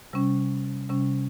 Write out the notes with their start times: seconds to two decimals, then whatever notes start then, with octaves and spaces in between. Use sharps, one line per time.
0.13 C3 G3 C#4
0.89 C3 G3 C#4